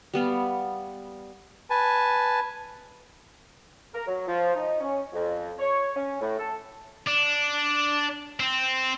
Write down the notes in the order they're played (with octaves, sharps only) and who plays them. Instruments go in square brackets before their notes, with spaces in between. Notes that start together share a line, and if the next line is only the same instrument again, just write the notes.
[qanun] G3 B3 F5
[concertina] B4 G#5 A5
[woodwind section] A#4
F#3
F3
D#4
C#4
F2
C#5
C#4
A2
A4
[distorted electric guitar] D4
C4